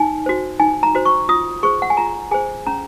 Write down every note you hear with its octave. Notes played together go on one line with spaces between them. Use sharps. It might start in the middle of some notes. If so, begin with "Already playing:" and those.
Already playing: D#4 G#5
F#4 C5
D#4 G#5
A#5
F#4 C5
C#6
F4 D#6
G#4 C5 C#6
F#5
G#5
F4 A#5
G#4 C5 G#5
C#4 A#5